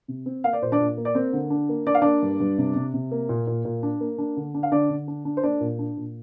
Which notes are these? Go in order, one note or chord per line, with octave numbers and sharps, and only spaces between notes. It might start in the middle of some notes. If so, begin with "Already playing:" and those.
C3
C4
A#3 F5
D5
A#2 C5
D4 D5
A#2
A#3
D5
A#3 C4 C5
D3
D4
A#3
D4 D5
F5
A#3 D4 D5
G2
G2
C3
C3
C3
A#3
A#2
A#2
A#2
D4
A#3
D4
D3
D4
F5
D3 D4 D5
D3
D4
D4
C5
A#3 D4 D5
A#2
D4
A#2